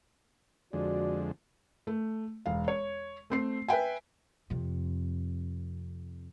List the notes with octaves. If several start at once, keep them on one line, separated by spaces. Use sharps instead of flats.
F2 D3 G#3 F#4 D5
A3
E1 F5
C#5
A3 C4 C7
B4 E5 G5 G#5
F2 C3